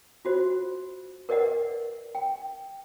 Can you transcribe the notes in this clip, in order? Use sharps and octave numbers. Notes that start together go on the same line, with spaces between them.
F4 F#4 C5
A#4 B4 D5 D#5 F#5
G5